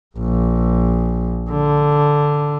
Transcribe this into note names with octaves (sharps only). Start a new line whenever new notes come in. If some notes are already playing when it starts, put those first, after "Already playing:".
A#1
D3